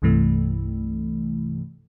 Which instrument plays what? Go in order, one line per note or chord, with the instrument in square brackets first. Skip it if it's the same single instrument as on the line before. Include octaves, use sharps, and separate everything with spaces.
[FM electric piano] C2 G2 C3 E3 A3